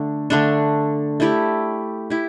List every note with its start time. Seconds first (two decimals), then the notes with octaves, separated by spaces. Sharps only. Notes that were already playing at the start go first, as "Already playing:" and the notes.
Already playing: D3 A3 D4
0.30 D3 A3 D4
1.20 A3 E4 G4
2.10 E4 G4